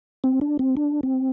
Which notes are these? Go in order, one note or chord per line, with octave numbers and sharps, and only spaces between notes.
C4
D4
C4
D4
C4